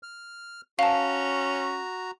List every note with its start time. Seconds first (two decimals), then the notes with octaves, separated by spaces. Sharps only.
0.03 F6
0.79 C#4 F#4 F5 A5 A#5